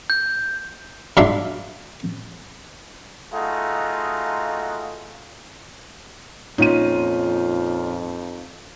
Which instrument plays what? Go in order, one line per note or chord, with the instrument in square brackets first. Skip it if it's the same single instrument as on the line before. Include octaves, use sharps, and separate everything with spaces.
[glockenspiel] G6
[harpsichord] G#2 F#3 D4 F4 E5 C6
[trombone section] A3 D#4 F4 F#4 G#4
[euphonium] F2 [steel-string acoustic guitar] A#2 [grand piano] C#4 F4 [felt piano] D#4 D#7